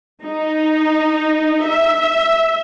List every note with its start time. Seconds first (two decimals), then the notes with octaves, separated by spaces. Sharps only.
0.24 D#4
1.68 E5